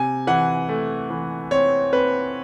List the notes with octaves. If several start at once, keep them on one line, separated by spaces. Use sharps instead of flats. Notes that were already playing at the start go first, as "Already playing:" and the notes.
Already playing: C3 G#5
E3 F#5
A3
E3
C4 C#5
C4 B4